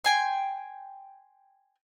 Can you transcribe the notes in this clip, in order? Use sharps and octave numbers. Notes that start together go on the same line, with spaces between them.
G5 G#5 C6